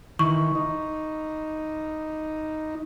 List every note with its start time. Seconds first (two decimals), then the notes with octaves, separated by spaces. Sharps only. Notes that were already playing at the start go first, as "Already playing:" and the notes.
0.19 D#3 E3 C#6
0.55 D#4